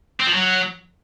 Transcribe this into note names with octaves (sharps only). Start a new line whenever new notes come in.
C4
F3
F#3